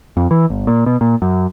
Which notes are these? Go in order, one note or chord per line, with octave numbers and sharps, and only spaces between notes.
F2
E3
G1
A#2
B2
A#2
F#2